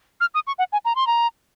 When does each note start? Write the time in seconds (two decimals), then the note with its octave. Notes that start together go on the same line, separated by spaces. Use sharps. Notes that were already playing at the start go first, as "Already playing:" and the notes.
0.21 F6
0.34 D#6
0.47 C#6
0.59 F#5
0.73 G#5
0.85 A#5
0.95 C6
1.07 A#5